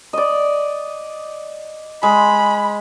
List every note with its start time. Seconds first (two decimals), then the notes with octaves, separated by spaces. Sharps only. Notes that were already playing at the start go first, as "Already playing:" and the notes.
0.13 D5 D#5
2.03 G#3 B5